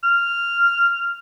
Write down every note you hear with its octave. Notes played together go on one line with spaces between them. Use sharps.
F6